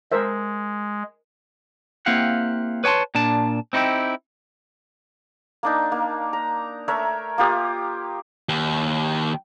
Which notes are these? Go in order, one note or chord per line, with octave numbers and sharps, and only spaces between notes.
G#3 A#4 C5 E5
A#3 C4 E4 G4 F5 F#5
B4 C#5 G5 A5 C6
A#2 D4 A5
C4 D#4 E4 F#4 G4
A#3 D4 D#4
A#3
A#5
A3 A#4 C#5 E5
A#3 F4 G4 D#6
D#2